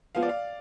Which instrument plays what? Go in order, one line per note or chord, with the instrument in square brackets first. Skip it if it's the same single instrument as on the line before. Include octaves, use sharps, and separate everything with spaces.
[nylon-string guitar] F3 G#3 B3 F4 [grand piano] F5
[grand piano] D5
F5